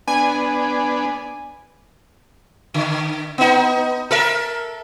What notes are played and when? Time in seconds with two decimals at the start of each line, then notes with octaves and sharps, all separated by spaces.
0.08 B3 D4 G#5
2.74 D3
3.38 B3 D#4
4.11 A4 A#4 E5